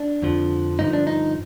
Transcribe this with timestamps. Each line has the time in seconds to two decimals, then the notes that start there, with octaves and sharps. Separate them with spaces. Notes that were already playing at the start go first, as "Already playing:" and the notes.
Already playing: D4
0.22 F2 D3 F3
0.79 G2 D3 F3 D#4
0.93 D4
1.07 D#4